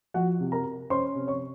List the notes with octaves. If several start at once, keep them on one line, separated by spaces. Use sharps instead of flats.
F3 F#4 F#5
C3
A#4 A#5
C3
C#4 C5 C6
C3
C#5 C#6